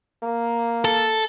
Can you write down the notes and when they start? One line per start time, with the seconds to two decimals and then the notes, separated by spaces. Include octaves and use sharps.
0.23 A#3
0.85 A4